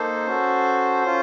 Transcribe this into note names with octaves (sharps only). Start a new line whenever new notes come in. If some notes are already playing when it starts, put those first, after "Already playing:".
Already playing: A#3 D#4 A4 C5
C#4 F#4 A4
C#4 F4